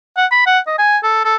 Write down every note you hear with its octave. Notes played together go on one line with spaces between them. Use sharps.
F#5
B5
F#5
D#5
G#5
A4
A4